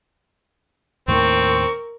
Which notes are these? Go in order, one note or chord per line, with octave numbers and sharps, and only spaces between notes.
D#2 A2 D#3 C4 A#4 C#6